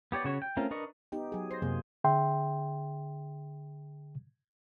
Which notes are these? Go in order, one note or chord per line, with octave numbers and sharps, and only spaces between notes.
B3 G4 C#5 D5
C#3 F#4 C#5
G5
A3 C4 C#4 F4 A#4
D4 A#4 B4 D#5 C#6
B3 D#4 G4 G5
F#3 G#4
C5 A#6 C7
F#2 C3 F#3 A#3 G#4
D3 G#4 E5 G5 C6